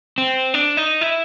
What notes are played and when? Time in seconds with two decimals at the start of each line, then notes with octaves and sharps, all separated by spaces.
0.18 C4
0.54 D4
0.77 D#4
1.01 E4